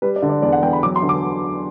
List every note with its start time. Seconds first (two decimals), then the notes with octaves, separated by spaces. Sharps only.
0.02 G3 B4
0.16 D5
0.22 D3
0.29 D5
0.42 E2 D5
0.52 F#5
0.62 E2 G5
0.73 B5
0.83 F#3 D6
0.96 C6
1.02 D3
1.09 D6